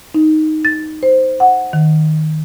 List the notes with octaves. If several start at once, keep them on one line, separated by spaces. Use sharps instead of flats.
D#4
A6
C5
F#5
D#3